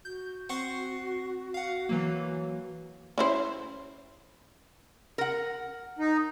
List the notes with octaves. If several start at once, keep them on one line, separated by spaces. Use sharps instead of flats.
F#4 G6
C4 F#5 C#6 C7
F5 F#5
E3 F#3 A#3
C#4 E4 C5
A#4 F#5
D#4